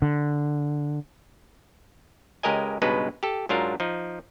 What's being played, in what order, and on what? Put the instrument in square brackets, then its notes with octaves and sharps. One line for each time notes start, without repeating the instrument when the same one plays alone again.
[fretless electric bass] D3
[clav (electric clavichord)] C#2 G#3 G4 A#4 D#5 G#5
C#2 G2 B2 G#3 D#4 B4
G4 A4
G#2 F#3 D4 F4 A#4
F3 D#4